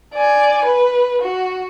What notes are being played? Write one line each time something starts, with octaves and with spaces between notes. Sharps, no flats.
D5 G#5
B4
F#4